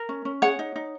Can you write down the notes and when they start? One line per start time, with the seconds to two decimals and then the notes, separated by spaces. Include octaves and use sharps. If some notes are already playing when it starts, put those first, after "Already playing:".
Already playing: A#4
0.09 C#4
0.25 C#4
0.42 G#4 C#5 F#5
0.59 D#4
0.76 D#4